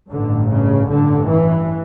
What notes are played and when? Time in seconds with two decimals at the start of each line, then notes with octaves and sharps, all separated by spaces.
0.10 A1 G2 D3
0.50 C#3
0.90 A1 G2 D3
1.29 E3